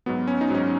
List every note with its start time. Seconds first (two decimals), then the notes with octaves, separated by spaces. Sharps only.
0.06 G#2 F#3 B3
0.28 C#4
0.41 D#4
0.50 G#2 F#3 B3 C#4